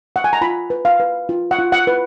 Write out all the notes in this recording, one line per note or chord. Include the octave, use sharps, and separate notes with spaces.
F#5
G#5
A#5
F4 B5
B4
F5
B4
F4
F#5
F4
F#5
B4